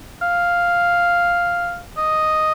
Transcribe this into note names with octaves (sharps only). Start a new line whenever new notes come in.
F5
D#5